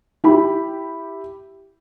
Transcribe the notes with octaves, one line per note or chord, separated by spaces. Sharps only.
E4 G4 B5